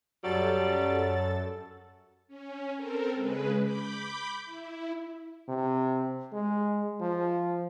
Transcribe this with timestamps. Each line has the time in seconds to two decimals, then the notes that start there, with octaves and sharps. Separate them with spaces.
0.23 F#2 F#3 G3 A4 A6
2.28 C#4
2.75 C4 A4 A#4
3.13 C#3 G#3 B4
3.59 B5 D6 G6
4.45 E4
5.48 C3
6.33 G#3
7.01 F3